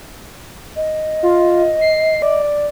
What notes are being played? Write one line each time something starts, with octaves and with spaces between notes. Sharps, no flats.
D#5
F4
C7
D5